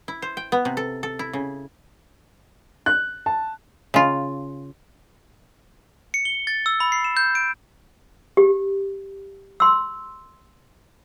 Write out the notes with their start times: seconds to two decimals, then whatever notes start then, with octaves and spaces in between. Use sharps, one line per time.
0.08 E4
0.22 C5
0.37 G5
0.52 B3
0.65 C3
0.77 A4
1.03 A4
1.19 E4
1.33 C#3
2.86 F#6
3.26 A5
3.94 C#3 F4
6.14 C#7
6.25 G7
6.47 A6
6.66 E6
6.80 B5
6.92 C7
7.04 E7
7.17 G6
7.35 D7
8.37 G4
9.60 C6 E6